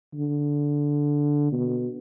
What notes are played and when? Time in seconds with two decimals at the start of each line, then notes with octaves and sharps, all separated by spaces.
0.14 D3
1.52 B2